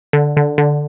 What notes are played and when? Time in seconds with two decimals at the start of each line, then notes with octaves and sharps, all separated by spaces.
0.13 D3
0.37 D3
0.58 D3